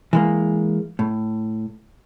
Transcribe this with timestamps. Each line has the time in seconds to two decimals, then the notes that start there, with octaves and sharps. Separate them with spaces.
0.13 E3 G#3 A#3
0.99 A2